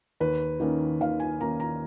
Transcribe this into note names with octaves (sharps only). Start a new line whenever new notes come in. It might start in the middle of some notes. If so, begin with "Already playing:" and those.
D#2 B4
D#3 A#3 C#4
D#2 F5
G#5
D#3 A#3 C#4 A#5
A#5